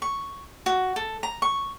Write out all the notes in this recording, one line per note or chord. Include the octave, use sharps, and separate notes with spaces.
C#6
F#4
A4
A#5
C#6